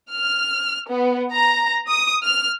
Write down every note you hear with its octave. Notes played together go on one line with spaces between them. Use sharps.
F6
B3
A#5
D#6
F6